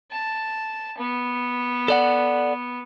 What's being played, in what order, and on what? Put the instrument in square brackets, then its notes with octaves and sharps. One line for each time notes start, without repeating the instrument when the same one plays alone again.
[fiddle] A5
B3
[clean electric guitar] A4 D5 F#5